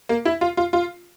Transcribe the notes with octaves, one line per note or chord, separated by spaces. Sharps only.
A#3
E4
F4
F4
F4